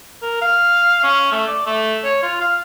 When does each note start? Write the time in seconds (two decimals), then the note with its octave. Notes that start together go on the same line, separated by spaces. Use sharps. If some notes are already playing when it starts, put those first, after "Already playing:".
0.22 A#4
0.41 F5
1.03 C#4
1.32 A3
1.48 D5
1.66 A3
2.04 C#5
2.23 F4
2.41 F5